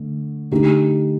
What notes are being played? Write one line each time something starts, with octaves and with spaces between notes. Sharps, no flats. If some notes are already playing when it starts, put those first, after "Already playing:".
Already playing: D3 A3
D3 A3 D#4 G4